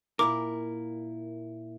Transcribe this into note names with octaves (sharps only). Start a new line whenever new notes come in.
A#2 E4 A#4 D6